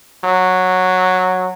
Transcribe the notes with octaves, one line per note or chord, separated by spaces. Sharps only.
F#3